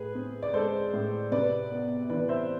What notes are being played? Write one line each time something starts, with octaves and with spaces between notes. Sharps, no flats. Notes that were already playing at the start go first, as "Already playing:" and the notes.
Already playing: A2 G#4 B4
C4
D5
G#3 A4 C5
A2
C3 B4 D5
B3
E3 B4 D5
C5 E5